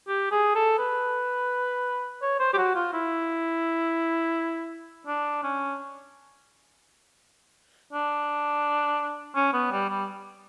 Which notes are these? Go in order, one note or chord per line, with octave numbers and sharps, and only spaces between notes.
G4
G#4
A4
B4
C#5
C5
G4
F#4
F4
E4
D4
C#4
D4
C#4
B3
G3
G3